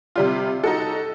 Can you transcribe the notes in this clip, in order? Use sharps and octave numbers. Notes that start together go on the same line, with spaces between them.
C3 G3 F4
D#4 F#4 A4